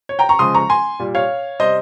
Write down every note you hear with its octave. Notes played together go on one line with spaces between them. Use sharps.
C#5
G5 A#5
A#5 C#6
C#3 F3 G#3 C6 D#6
A#5 C#6
G#5 C6
A#2 G3
C#5 F5
C3 G3 C5 D#5